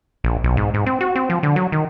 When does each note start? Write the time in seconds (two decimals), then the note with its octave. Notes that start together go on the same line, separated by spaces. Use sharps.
0.24 A#1
0.44 B1
0.57 G#2
0.74 G#2
0.86 C4
1.01 F#4
1.16 C4
1.30 F3
1.43 D3
1.56 F#3
1.72 D#3